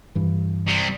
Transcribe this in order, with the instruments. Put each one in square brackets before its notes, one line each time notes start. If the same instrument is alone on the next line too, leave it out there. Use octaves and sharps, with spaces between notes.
[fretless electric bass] G2 E3
[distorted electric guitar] C3 G3